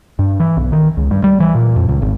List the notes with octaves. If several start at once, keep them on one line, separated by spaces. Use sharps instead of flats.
G2
E3
B1
D#3
C#2
G2
G3
E3
A#2
F2
C#2
G#1